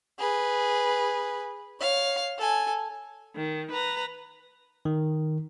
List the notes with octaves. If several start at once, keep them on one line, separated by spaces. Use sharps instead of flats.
G#4 B4
C#5 F5
A4 G#5
D#3
B4 A#5
D#3